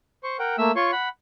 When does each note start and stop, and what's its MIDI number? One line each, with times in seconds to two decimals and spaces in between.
0.24 0.37 72
0.24 0.37 85
0.39 0.56 70
0.39 0.56 78
0.39 0.56 79
0.58 0.72 57
0.58 0.72 58
0.58 0.72 76
0.58 0.72 88
0.76 0.91 65
0.76 0.91 73
0.76 0.91 84
0.76 0.91 85
0.92 1.09 78
0.92 1.09 83